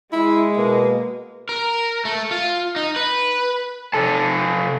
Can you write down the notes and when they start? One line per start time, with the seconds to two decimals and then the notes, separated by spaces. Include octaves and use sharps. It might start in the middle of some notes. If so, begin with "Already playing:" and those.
0.13 G#3 E4
0.57 B2 A#3
1.49 A#4
2.05 A3
2.31 F4
2.76 D#4
2.96 B4
3.94 C3 A4 A5